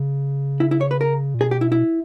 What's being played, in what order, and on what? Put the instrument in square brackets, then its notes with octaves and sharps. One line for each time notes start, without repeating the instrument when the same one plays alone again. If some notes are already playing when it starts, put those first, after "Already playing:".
Already playing: [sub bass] C#3
[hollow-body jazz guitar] E4
E4
C#5
B4
A#4
[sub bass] A#2
[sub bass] B2 [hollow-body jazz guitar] G#4
[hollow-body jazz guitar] G4
E4
E4